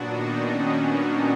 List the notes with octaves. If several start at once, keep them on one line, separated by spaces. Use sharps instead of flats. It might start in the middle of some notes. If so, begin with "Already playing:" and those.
Already playing: A#2 F#3 B3 D4 F#4
D#3 D#4
C#4
D4